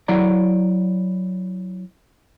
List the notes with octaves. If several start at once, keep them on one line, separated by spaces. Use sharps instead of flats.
F#3 E4 D5 A#5